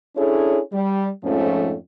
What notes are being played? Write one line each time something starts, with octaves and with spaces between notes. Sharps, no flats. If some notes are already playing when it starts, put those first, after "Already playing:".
C#4 D4 E4 G#4 A4 C#5
G3
F2 G#2 F3 A3 C#4